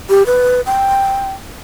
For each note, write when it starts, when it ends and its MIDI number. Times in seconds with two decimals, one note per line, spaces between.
0.09 0.26 67
0.26 0.61 71
0.66 1.31 79